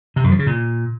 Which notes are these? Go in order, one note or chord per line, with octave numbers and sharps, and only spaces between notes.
C3
F#2
F3
C#3
A#2